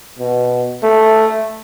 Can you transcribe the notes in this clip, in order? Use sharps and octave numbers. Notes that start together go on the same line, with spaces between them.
B2
A3